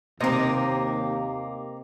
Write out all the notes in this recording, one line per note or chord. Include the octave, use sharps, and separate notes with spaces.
D#2 C3 A#3 C4 D#5